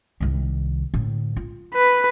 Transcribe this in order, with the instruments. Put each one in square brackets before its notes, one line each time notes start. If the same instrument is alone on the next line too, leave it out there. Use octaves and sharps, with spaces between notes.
[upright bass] C2 D#3
A2 D3
F4
[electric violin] B4